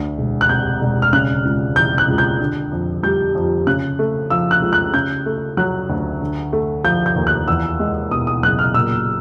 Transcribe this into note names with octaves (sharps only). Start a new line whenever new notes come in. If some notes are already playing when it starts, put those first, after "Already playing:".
Already playing: D2
E1
F#6
C3 G6
E1
F6
C#3 F#6
C#2
E3 G6
F#6
C#2
G6
D3
F2
G3 G6
F2
C#3 F#6
A3
F3 E6
F#6
C#2
F#6
C#3 G6
A3
F#3 F#6
D2
D3
A3
F3 G6
G6
D#2
F#6
E2 E6
G#3
B2 D#6
D#6
F#1 F#6
F6
A#2 E6